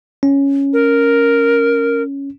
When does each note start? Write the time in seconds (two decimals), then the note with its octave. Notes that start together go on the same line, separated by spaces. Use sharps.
0.23 C#4
0.73 A#4